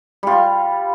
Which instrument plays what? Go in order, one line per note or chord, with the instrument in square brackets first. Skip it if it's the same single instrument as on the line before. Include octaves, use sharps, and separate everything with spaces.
[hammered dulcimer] G3 F4